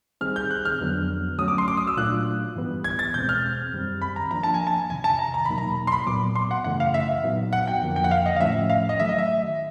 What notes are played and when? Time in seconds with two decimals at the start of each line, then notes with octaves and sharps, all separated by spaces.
0.21 D#3 G3 C4 D#4 G#4 F6
0.36 G6
0.51 F#6
0.65 F6
0.80 F2 D3 F#3 B3 D4
1.38 F#3 A3 C#4 F#4 D#6
1.48 D6
1.58 C6
1.68 D6
1.77 D#6
1.87 E6
1.97 A#2 F#3 A3 D4 F4 F#6
2.55 G2 E3 G3 B3
2.84 G#6
2.99 A6
3.14 E2 B2 G#3 C4 G6
3.29 F6
3.72 F#2 D#3 G3 C4
4.02 B5
4.16 A#5
4.31 F3 A#3 D4 A#5
4.43 A5
4.54 G#5
4.67 A5
4.89 E2 C3 D#3 G#5
5.04 A5
5.19 A#5
5.34 A#5
5.45 E2 B2 F#3 A#3 D#4 B5
5.58 A#5
5.87 C6
5.92 B5
6.06 A#2 F#3 B3 D6
6.35 C6
6.51 F#5
6.64 F#2 C#3 E3 A3 F#5
6.80 F5
6.94 E5
7.09 F5
7.23 A#2 F#3 B3 D#4 F#4
7.53 F#5
7.67 G5
7.81 F2 D3 F3 A#3
7.96 G5
8.04 F#5
8.11 F5
8.26 D#5
8.36 F5
8.40 A2 F3 A3 C#4 E5
8.70 F5
8.89 D#5
8.99 D#3 F#3 A3 E5
9.09 D#5
9.18 E5